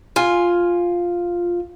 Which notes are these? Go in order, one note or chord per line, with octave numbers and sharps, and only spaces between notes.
F4 G#5